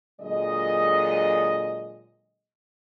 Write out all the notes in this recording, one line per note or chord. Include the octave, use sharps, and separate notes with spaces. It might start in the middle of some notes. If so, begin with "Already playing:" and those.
A#2 D3 F#3 G#3 D#5